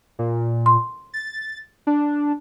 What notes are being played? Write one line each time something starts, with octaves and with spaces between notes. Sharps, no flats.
A#2
C6
A6
D4